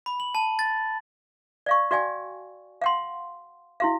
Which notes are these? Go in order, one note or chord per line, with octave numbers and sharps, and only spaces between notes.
B5
F#7
A5
A6
D5 F5 C#6
F#4 D5 F5 G5 G#5
F5 F#5 C6
E4 F#4 F5